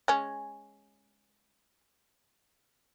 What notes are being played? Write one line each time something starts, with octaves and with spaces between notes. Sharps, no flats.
G#3 C#4